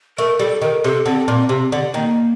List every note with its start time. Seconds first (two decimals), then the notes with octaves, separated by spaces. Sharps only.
0.18 A3 A#4
0.39 G3 A4
0.62 D#3 A#4
0.84 C3 A4
1.06 D3 C4
1.28 A#2
1.49 C3
1.72 D3
1.94 D#3 A#3